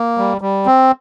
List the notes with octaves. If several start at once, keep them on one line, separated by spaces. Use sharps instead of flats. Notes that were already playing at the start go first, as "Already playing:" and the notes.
Already playing: A#3
G3
G3
C4